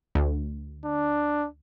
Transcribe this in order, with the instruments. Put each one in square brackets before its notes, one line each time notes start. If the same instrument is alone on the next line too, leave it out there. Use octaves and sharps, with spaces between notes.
[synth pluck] D2
[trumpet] D4